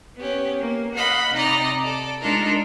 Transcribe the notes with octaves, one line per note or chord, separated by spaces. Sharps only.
B3 C#4 G4
A#3
D#5 F5 F#5 B5
C3 D#4 D5 D#5 A#5
A4 D5
G#3 D4 D#4 F4 A4 A#4